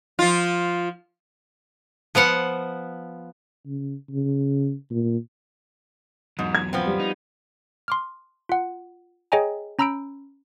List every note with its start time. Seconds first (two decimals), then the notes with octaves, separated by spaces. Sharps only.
0.19 F3 F4
2.15 F3 B3 F5 F#5
3.66 C#3
4.10 C#3
4.90 A#2
6.39 E2 G#2 F#3
6.55 G#6
6.73 F3 B3 C4
6.86 G3
6.99 D#4
7.88 C6 D6 F6
8.49 F4 F#5
9.32 G#4 C#5 D#5 G5 G#5 A#5
9.79 C#4 A#5 B5 E6 G6 D7